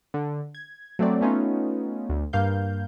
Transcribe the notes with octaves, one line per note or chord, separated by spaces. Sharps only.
D3
G#6
F#3 A3 C4 D5
A3 B3 C#4 D#4 F4
D2
G2 A#3 F5 G6